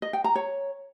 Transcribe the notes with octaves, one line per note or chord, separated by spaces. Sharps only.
D#5
G5
A#5
C#5